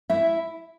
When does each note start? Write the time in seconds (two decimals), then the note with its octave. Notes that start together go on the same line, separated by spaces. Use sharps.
0.10 E4 E5